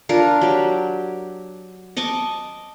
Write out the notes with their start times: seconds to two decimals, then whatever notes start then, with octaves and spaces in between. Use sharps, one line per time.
0.09 D4 F4 A#4
0.41 F#3 G4
1.97 D#5 A5 C#6 D6